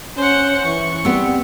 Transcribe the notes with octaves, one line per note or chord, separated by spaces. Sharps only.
C#4 C5 F#5
E3 C#6
G3 B3 C4